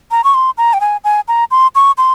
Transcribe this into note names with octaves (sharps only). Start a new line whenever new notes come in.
A#5
C#6
C6
A#5
G5
G#5
G#5
A#5
C6
C#6
C6